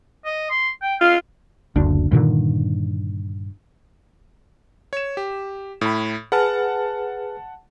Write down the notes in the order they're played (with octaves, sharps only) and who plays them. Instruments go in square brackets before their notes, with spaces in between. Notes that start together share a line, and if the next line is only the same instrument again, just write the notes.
[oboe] D#5
C6
G5
[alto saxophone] F4 [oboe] F5
[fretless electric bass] F#1 D2 D4
G2 A#2 D3 D#3
[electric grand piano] C#5 E7
G4
A2 B5
[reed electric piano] G#4 B4 F6 [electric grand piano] F#5 A5